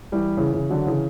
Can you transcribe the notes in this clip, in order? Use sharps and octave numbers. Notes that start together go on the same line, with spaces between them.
E3 G3
C#3 E3
C#3 E3
D3 F#3
C#3 E3